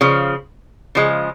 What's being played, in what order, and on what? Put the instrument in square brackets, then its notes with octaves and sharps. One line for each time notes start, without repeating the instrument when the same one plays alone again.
[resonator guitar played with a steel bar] C#3 F3
C#3 F3 G#3